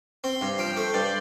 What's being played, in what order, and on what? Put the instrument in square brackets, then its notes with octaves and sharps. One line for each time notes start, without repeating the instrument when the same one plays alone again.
[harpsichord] C4 [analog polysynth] C6
[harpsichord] G2
[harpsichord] F3 [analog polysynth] G5
[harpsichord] A3
[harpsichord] G2 [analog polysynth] D5